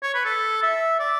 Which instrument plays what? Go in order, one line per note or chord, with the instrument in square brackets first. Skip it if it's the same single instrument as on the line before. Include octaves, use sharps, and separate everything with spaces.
[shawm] C#5
B4
A4
E5
D5